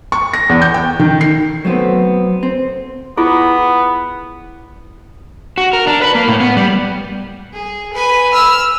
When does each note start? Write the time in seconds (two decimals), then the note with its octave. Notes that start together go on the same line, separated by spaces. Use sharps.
0.12 C#6
0.33 A#6
0.49 E2
0.62 G6
0.74 G5
0.99 D#3
1.21 C7
1.65 F#3 A3 B3 C4
2.43 C4
3.17 B3 E4 F4 G#4
5.58 F#4
5.73 A#4
5.87 D4
6.02 B4
6.15 A#3
6.28 A2
6.40 B3
6.57 G3
7.53 G#4
7.94 B4 G#5
8.34 E6 F6